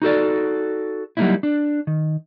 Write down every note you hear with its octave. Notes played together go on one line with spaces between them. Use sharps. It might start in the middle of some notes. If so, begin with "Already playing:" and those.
D#4 F#4 A4 D5
F#3 G3 A#3 C#4 D#4 E4
D4
D#3